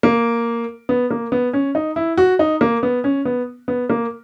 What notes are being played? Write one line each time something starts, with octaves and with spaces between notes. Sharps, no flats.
A#3
B3
A#3
B3
C#4
D#4
E4
F#4
D#4
A#3
B3
C#4
B3
B3
A#3